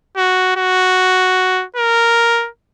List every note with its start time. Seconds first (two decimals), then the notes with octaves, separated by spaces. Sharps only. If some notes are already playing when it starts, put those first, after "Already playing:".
0.17 F#4
0.56 F#4
1.76 A#4